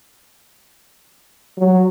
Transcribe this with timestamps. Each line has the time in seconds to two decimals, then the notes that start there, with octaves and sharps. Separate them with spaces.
1.58 F#3